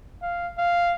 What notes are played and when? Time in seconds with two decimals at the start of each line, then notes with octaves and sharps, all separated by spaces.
0.22 F5
0.58 F5